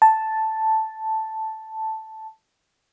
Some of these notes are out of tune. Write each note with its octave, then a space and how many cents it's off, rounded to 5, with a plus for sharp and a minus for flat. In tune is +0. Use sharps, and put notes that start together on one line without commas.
A5 +0